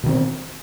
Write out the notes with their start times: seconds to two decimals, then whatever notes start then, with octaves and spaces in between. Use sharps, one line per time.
0.04 B2
0.06 D#3
0.09 C4